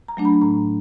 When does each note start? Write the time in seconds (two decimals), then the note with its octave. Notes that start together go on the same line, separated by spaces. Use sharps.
0.08 A#5
0.17 F#3 A3 D4
0.25 B5
0.42 A2 A#5